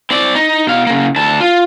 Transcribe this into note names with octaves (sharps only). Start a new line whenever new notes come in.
C4 D5
D#4
B2 F5
C#3 A#3
D2 A5
F4